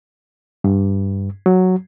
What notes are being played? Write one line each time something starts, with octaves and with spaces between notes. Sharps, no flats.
G2
F#3